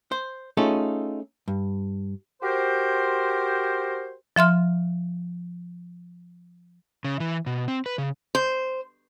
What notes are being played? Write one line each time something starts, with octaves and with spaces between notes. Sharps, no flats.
C5
A3 C#4 D#4 F4 G#4 A4
G2
F#4 G4 A#4 C5
F3 E5 C6 F6
C#3
E3
B2
C4
B4
C#3
C5